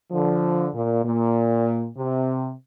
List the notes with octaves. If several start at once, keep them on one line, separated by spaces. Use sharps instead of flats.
D3 F3
A#2
A#2
C3